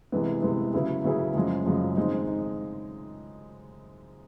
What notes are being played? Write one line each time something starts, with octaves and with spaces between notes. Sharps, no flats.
C3 E3 G#3 B3
C3 E3 G#3 B3
C#3 F#3 B3 E4 G#4
C#3 F#3 B3 E4 G#4
F#2 C#3 F3 G#3
F#2 C#3 F3 G#3
D#3 G#3 C4 D#4
D#4